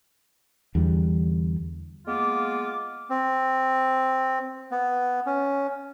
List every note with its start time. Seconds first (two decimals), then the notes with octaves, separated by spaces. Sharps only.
0.75 E2 D3 G3
2.07 G#3 A#3 B3 F4 D6
3.10 C4
4.72 B3
5.26 C#4